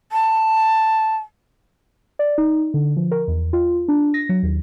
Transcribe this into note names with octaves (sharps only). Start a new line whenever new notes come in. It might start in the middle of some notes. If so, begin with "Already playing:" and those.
A5
D5
D#4
D3
F3
A#4
E2
F4
D4
A#6
F#3
D#2